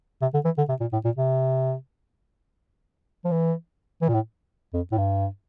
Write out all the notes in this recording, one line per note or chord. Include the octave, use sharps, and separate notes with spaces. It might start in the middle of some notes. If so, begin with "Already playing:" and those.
C3
D3
E3
D3
C3
A#2
A2
A#2
C3
F3
E3
E3
A#2
A2
F2
A2
G2